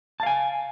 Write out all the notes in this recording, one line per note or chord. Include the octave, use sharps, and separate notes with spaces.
F5 G#5 A5